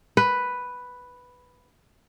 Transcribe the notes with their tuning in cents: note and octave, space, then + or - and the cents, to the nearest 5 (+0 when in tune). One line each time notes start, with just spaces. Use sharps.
B4 +0